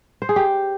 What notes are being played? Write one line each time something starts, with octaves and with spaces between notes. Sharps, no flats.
C5
G#4
G4